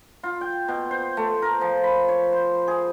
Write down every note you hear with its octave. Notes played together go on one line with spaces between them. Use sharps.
F4
G5
B2
C5
A3
A#4
F3
B5
C#5
C5
G#4